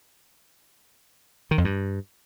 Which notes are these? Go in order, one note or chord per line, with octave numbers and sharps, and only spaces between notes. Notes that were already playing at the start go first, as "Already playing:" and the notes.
D#3
F2
G2